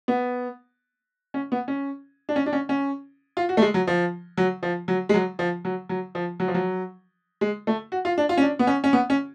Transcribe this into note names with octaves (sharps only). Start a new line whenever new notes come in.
B3
C#4
B3
C#4
D4
C#4
D4
C#4
C#4
F4
F#4
A3
G#3
F#3
F3
F#3
F3
F#3
G#3
F#3
F3
F#3
F#3
F3
F#3
F3
F#3
G#3
A3
F#4
F4
D4
F4
C#4
D4
B3
C#4
C#4
B3
C#4